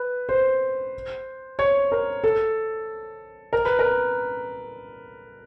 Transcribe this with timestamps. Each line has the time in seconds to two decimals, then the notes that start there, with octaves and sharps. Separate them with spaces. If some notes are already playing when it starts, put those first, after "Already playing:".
Already playing: B4
0.29 C5
1.59 C#5
1.92 A#4
2.24 A4
3.53 A#4
3.65 B4
3.79 A#4